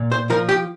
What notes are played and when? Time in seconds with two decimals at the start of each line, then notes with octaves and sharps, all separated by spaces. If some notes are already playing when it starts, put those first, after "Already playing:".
Already playing: A#2
0.12 C5
0.30 F3 A#4
0.49 G4